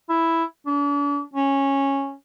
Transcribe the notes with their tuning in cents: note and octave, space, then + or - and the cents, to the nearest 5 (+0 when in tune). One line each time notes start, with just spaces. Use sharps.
E4 +0
D4 -40
C#4 -10